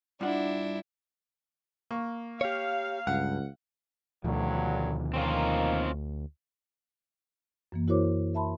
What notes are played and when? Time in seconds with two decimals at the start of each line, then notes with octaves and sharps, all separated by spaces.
0.21 G2 D4 E4 F4 F#5
1.91 A#3 C#6
2.41 G4 C#5 F5
3.07 C#2 G2 F#5
4.24 D2 G2 B2 D3 D#3 F3 F#3
5.14 A#3 C4 C#4 D#4 F4
7.72 F#2 E3 A#3
7.88 E4 F#4 A#4 C5 C#5 D6
8.34 A#4 E5 A5 B5 C6